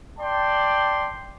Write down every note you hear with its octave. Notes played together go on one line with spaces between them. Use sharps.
D5 G5 A5 C6